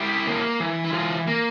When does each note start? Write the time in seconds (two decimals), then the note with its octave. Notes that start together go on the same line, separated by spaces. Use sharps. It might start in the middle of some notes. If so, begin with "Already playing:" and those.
Already playing: E4 G4
0.27 A#3
0.60 E3
0.84 E4
0.93 E3 F4
1.27 A#3